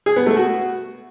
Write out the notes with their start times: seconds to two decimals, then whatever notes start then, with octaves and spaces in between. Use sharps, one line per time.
0.06 G#4
0.16 B3
0.27 A3
0.37 F#4